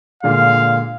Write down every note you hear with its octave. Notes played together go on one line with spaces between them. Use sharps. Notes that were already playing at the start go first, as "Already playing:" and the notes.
A#2 D3 G#3 F5